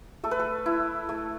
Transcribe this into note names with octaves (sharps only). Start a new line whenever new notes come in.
A3 A4
B4
A4
E4
A3